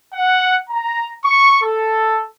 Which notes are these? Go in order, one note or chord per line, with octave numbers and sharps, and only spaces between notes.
F#5
A#5
C#6
A4